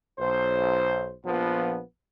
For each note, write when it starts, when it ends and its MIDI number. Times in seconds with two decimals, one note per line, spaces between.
0.19 1.13 35
0.19 1.13 72
1.26 1.80 34
1.26 1.80 53
1.26 1.80 59